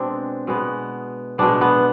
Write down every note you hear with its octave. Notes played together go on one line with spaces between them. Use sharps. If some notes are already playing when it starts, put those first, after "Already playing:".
Already playing: B2 G#3 B3 C4 D4
B2 G#3 B3
B2 G#3 B3 D4
B3